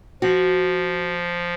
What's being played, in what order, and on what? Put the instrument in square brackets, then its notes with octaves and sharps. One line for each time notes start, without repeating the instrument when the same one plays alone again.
[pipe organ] F3 [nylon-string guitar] F#4